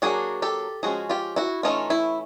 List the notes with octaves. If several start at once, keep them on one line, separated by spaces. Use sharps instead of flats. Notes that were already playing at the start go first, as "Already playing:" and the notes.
F#3 A#3 D4 F#4 G#4
G4 A4
F3 G#3 C#4 F#4 G#4
F4 G4
E4 F#4
E3 A3 C#4 D#4 F4
E4